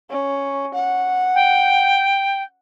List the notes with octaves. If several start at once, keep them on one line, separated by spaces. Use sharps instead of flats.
C#4
F#5
G5